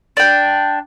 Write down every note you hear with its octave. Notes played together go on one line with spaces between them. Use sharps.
D4 G5